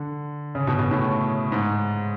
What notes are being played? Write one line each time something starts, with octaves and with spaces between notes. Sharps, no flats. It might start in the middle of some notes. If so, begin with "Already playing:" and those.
Already playing: D3
C#3
B2
B2
A2
G#2